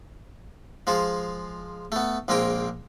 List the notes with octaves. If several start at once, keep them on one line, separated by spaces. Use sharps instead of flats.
F3 G#3 F4
A3 B3
A#1 G#3 A#3 C4 A#4 G5